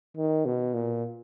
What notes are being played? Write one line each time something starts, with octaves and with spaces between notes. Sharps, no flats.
D#3
B2
A#2